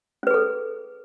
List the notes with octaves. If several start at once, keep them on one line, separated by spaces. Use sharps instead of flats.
C#4 G#4 A4 B4